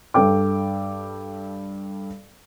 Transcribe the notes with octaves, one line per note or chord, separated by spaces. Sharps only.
G2 A4 G5 D6